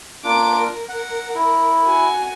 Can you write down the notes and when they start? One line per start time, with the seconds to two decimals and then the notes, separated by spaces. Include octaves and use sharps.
0.24 A#3 D4 F4 D6 D7
0.58 A#4
0.89 F#5
1.35 E4
1.85 F#4 G#5